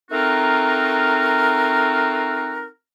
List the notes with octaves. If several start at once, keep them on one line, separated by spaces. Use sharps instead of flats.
A3 C4 D#4 F4 F#4 A#4